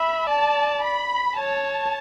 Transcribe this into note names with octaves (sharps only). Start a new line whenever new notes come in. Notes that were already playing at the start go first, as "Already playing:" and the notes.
Already playing: E5 B5
D5 A5
B5
C#5 A5